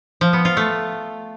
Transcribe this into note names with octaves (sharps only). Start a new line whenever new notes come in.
F3
B3
F4
A3